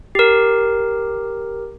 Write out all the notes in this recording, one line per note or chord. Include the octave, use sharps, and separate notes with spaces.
G4 A#4